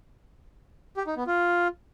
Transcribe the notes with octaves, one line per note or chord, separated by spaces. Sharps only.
G4
D#4
B3
F4